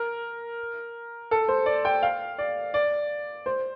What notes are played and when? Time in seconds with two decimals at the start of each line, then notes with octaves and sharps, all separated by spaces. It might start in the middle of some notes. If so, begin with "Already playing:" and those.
Already playing: A#4
1.31 A4
1.48 C5
1.66 D5
1.85 G5
2.03 F5
2.38 D5
2.74 D5
3.46 C5